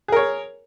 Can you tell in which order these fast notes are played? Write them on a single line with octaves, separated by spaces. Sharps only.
G#4 A#4 C#5